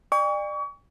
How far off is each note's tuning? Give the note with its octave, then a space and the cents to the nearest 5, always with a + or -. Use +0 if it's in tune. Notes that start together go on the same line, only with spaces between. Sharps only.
D5 +35 G5 +45 C#6 +35